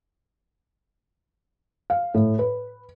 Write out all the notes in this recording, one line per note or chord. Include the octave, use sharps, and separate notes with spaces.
F5
A2
B4